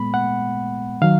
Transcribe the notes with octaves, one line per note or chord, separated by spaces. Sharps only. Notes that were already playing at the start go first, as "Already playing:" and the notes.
Already playing: A#2 G#3 B3 B5
F#5
D#3 F#3 F5